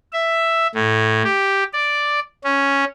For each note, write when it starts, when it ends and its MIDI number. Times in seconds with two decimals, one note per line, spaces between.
0.13 0.67 76
0.74 1.22 45
1.24 1.64 67
1.73 2.20 74
2.44 2.84 61